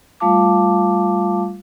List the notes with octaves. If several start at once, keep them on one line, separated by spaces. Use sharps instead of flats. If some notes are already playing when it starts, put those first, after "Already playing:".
G3 A3 F4 F5 A5 D6